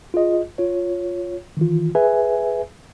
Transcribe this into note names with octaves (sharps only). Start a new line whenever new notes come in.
F4 G#4 D#5
F4 C#5
D#3 E3 F4
G#4 B4 E5 G#5